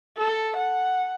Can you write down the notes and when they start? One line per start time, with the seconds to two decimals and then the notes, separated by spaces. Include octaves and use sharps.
0.18 A4
0.57 F#5